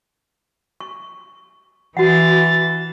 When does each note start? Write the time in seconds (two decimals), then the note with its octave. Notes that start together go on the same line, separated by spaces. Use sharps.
0.80 C#6
1.97 E3 F#4 F#5 A6